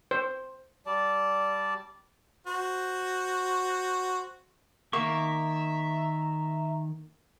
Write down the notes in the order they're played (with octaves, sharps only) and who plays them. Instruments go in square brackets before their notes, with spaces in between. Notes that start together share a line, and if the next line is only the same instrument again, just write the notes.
[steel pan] C5
[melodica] G3 D5 A5
[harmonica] F#4 C5
[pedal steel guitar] D#3 C#6 [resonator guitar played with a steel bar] A#3 [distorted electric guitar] E5 [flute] A#5